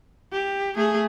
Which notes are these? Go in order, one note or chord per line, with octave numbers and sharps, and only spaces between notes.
G4
A3 G#4